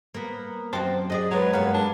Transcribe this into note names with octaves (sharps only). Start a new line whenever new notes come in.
A#3 B3
F#2 C4 F#4 C5 A5
G#4 D5 D#5
F#2 F#3 G#3 B4 C#5
G2 A#3 B3
D4